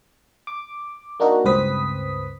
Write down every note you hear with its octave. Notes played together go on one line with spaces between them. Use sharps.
D6
A#3 D4 D#4 F#4 A#4
C#2 G2 C4 B4 D#6 B6